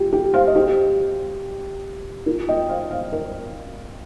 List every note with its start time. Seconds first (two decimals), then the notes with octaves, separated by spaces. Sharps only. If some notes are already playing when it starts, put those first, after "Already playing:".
Already playing: F4 G4
0.13 G4
0.34 C5 F5
0.47 D#5
0.55 G4 C5
2.26 F4 A#4
2.48 D#5 G5
2.69 C5 F5
2.90 C5 F5
3.12 A#4 D#5